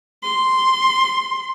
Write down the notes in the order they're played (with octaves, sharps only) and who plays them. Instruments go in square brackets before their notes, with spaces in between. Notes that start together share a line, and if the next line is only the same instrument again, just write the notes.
[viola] C6